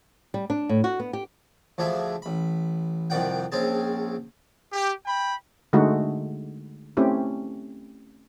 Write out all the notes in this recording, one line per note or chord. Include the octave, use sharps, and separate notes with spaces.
G3
D4
A2
F#4
B3
G4
D2 F3 D4 G#4 E5
A1 B5
C2 F2 D#3 D5 F#5 G5
A#1 C4 C#4 G#4 A5
G4
G5 B5
D3 G#3 A3 D#4 F#4
A3 C4 C#4 E4 G4